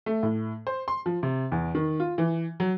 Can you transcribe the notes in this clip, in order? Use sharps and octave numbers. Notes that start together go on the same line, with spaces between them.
A3
A2
C5
C6
F3
C3
E2
D#3
F4
E3
F#3